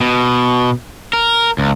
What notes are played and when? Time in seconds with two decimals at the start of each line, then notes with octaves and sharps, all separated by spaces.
0.01 B2
1.13 A#4
1.58 C#2